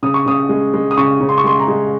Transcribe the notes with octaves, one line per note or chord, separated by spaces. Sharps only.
C#3 D#6
C#6
C#3 D#6
G#3
G#3
D#6
C#3 C#6
C#3
C6
C#6
G#3 C6
A#5
G#3